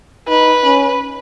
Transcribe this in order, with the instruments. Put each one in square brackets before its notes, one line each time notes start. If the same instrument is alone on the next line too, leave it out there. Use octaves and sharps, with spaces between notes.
[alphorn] D#4 [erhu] B4
[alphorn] C#4